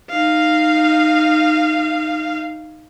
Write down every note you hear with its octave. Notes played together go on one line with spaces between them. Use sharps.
D#4 F5